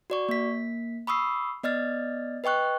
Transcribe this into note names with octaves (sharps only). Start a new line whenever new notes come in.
F#4 D5 C#6
A#3 B6
B5 C#6 D#6 E6 C7
B3 D5 D#5 F6 A6
B4 D#5 G5 C#6 F#6